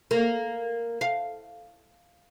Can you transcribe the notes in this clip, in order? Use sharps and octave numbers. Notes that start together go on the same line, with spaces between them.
A#3
F5